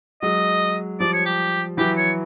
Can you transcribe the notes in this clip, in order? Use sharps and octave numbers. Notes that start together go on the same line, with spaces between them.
F#3 G#3 D#5
F3 G3 D5
C#5
G4
E3 F#3 G4
C#5